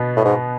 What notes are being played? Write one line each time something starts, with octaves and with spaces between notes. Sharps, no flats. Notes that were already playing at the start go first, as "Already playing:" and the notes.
Already playing: B2 B3
A2
G#2